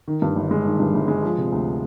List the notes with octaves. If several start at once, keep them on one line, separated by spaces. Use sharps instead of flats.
D#3
G2
G1
G#3
D#3
G2
G1
G#3
F3
C3
D2